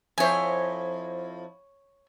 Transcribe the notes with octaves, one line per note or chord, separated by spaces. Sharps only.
F2 E4 C5 C#5 G#5